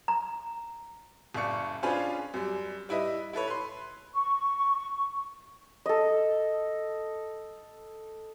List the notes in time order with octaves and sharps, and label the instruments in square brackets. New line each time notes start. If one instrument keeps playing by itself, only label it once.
[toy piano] A#5
[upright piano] F#1 C#3 D5 C#6 C#7
C#4 D4 F4 G#4 B4 C5
F#2 G3
G3 E4 B4 D#5 E5
E4 A4 B4 C#5
B4 C6
[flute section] C#6
[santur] A4 D#5